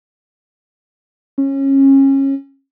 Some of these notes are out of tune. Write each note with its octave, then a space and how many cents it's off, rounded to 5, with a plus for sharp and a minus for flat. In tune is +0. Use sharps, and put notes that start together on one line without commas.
C#4 -25